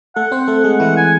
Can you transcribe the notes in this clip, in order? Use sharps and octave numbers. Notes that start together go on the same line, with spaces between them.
A3 A4 F#5
C4 C5
A3 A4
G#3 G#4
E3 E4 F#5
G#5